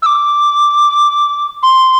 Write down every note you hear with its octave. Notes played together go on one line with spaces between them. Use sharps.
E6
D6
C6